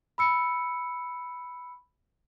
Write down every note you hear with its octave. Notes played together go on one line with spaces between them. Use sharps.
B5 E6 C#7